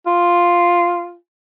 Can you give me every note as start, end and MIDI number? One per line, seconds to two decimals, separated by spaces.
0.06 1.16 65